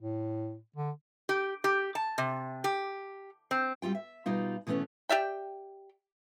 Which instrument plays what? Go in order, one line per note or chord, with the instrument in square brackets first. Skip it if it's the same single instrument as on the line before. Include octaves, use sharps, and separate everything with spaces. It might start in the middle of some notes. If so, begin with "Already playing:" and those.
[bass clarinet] A2
D3
[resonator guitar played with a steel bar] G4
G4
A5
C3
G4
C4
[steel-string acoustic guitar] G3 C4 F4 G5
E5
B2 G3 D#4 F4
B2 E3 A3 B3 C#4
[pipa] G4 D5 E5 G5